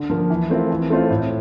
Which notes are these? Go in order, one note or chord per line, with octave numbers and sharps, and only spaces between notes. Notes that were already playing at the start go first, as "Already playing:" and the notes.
Already playing: D3
F3 A#3
E3
A3 C4 F4 A#4
E3
A3 C4 F4 C5
A2